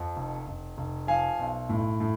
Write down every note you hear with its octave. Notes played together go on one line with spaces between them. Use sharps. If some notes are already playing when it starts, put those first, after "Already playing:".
Already playing: F2
F1
F1
F1
F3 F5 G#5
B1
A2
A2